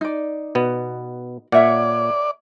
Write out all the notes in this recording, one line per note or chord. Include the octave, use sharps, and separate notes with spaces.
D#4 D5
B2 B3
A#2 C#5 D5 E5 F#5